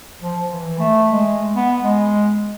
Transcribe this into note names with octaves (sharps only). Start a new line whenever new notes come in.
F3
E3
A3
G#3
B3
G#3